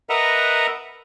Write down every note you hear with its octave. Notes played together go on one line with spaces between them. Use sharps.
A#4 B4 D#5 E5 F#5 A#5